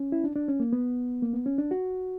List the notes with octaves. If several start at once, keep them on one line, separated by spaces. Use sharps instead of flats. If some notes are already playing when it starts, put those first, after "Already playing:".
Already playing: C#4
E4
D4
D4
C#4
A#3
B3
A#3
B3
C#4
D4
F#4